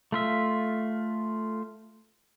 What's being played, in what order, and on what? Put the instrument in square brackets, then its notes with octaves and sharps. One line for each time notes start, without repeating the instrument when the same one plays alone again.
[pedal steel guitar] A3 F4 E5